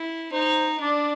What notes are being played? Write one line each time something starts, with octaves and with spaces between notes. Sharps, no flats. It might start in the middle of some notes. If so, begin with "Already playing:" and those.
Already playing: E4
D#4 C5
D4 D5